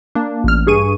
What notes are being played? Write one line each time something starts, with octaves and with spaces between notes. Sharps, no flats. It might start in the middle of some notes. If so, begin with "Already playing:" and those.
A#3 D4
A1 F6
G2 G#4 C#6 D#7